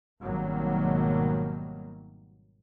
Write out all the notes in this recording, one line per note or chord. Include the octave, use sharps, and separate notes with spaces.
G#1 B2 D#3 F#3 G3 A#3